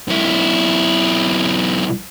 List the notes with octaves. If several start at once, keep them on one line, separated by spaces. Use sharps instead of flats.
B1 E4